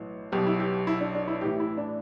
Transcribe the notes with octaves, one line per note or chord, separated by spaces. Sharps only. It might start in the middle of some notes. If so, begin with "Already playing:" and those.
Already playing: B1 A2 E3
B1 B2 G4
E4
G4
E4
D4
D4
E4
A1 A2 E3 G4
E4
D4